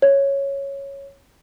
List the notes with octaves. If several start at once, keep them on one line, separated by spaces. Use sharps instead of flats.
C#5